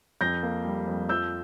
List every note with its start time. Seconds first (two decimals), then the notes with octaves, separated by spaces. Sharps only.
0.21 F2 G6 A#6
0.43 A#3
0.65 G3
0.88 F2
1.09 F3 E6 G6